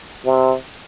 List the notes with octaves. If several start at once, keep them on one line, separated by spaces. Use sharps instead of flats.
C3